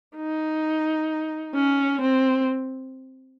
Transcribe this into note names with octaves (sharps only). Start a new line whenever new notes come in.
D#4
C#4
C4